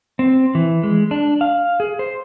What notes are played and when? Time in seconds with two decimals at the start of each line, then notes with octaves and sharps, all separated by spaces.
0.19 C4
0.55 E3
0.83 G#3
1.11 D4
1.41 F5
1.80 G#4
1.99 C5